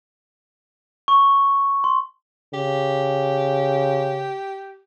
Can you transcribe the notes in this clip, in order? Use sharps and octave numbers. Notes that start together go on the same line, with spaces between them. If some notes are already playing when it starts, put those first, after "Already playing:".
C#6
C6
C#3 G4